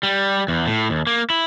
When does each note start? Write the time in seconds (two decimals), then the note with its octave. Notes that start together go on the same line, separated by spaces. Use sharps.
0.03 G3
0.48 E2
0.67 A2
0.90 D#2
1.07 A#3
1.30 E4